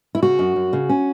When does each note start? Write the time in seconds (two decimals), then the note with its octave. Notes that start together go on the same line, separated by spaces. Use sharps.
0.15 E4
0.22 C#3 F#4
0.39 F#2
0.56 F#2
0.73 C#3
0.89 C#4